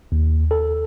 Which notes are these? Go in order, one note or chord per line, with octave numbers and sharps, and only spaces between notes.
D#2
A4